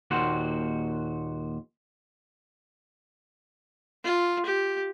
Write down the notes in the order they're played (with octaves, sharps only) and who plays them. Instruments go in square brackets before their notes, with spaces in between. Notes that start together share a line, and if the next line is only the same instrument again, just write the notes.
[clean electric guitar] D#2 A#2 F#4 C5
[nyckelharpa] F4
G4